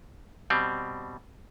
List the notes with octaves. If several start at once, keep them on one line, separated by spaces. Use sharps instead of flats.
B2 G3 C4